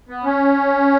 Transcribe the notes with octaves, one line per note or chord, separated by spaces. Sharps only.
B3
C#4